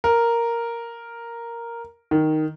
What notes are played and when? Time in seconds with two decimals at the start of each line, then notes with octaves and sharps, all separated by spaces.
0.04 A#4
2.11 D#3